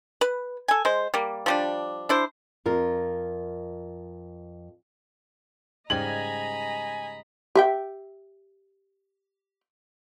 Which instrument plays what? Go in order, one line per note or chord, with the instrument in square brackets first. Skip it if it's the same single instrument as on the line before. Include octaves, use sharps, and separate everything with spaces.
[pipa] B4
A4 G#5
G#3 C5
G3 A#3
F3 G3 D4
D4 E4 C5
[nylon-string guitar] F2 F4 A#4
[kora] G#2 C#3 G3 [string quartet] D#5 A#5 B5 [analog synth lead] G#5 [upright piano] F#7
[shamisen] G4 E5 G5